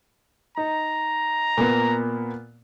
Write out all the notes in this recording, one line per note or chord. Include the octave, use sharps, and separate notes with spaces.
D#4 A#5
A#2 A#3 B3